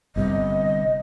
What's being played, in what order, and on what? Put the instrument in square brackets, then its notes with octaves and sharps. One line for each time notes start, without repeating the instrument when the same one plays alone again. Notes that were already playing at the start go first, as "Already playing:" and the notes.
[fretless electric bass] G1 G2 C3 [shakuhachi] D#5